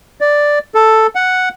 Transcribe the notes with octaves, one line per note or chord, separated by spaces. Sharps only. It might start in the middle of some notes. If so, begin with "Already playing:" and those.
D5
A4
F#5